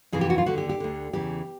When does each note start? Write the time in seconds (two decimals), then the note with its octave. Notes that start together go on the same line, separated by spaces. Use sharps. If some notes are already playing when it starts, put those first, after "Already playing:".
0.12 F2 C3 E3 G#4
0.21 G4
0.30 F#4
0.38 F4
0.46 D#2 D3 F#4
0.58 G4
0.69 G4
0.80 D2 D3
1.13 E2 C#3 E3 G4